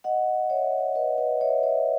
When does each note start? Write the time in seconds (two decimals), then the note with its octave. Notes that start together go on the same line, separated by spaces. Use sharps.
0.04 D#5 F#5
0.50 C#5 E5
0.95 B4 D#5
1.18 B4 D#5
1.41 C#5 E5
1.63 C#5 E5